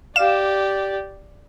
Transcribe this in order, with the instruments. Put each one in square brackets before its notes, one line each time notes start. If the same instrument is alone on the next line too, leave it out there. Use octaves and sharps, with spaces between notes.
[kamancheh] G4 D5 [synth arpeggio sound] F5 E7